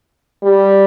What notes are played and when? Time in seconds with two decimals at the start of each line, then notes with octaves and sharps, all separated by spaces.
0.44 G3